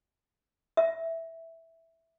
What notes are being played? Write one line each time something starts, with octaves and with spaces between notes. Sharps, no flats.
E5